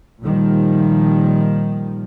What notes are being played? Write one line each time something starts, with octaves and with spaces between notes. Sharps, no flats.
A#2 D#3 F3 G3